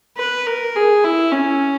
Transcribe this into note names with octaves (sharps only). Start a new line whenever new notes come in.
B4
A#4
G#4
E4
C#4